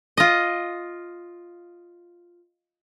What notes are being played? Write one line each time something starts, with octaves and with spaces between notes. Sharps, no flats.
F4 D#5